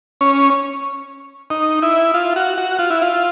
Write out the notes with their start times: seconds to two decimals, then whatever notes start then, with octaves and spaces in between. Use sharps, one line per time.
0.21 C#4
1.50 D#4
1.82 E4
2.14 F4
2.36 F#4
2.58 F#4
2.79 F4
2.90 E4
3.02 F4